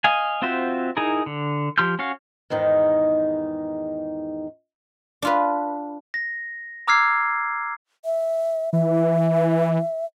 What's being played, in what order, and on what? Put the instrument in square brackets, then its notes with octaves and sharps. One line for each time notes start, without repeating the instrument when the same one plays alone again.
[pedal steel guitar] D#5 F5 G#5
C4 F4 F#4 C5 E5
D#4 E4 G#4 A#4
D3
F3 G4 C6 F6 G6
C#4 F#4 C#5 F5
[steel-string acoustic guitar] E2 G#2 D#3 D#4
[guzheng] D4 F4 B4
[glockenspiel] A#6
A#5 D6 E6 F6 G#6 C7
[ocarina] E5
[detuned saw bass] E3 [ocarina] E5